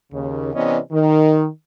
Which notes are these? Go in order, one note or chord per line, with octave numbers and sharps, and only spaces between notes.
D#2 C#3
C3 E3 B3 C#4 D5 D#5
D#3